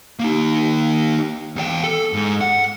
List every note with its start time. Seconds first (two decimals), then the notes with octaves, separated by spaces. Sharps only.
0.19 A#3 D#4
1.56 E2 G5
1.84 A4
2.13 G#2
2.41 F#5